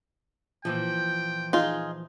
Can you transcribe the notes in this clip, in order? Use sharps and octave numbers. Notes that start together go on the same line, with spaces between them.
A#2 E3 F3 G5
D#4 F4 G#4